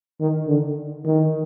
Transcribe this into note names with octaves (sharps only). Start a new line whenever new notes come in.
D#3
D3
D#3